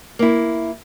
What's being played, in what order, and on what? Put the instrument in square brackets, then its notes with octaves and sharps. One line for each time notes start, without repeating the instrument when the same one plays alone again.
[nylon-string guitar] A#3 E4